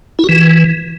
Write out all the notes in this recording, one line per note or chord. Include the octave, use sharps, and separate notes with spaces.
E4
F#4
E3